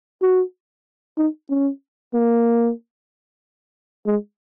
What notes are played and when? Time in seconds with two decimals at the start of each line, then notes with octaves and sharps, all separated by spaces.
0.22 F#4
1.18 D#4
1.50 C#4
2.14 A#3
4.06 G#3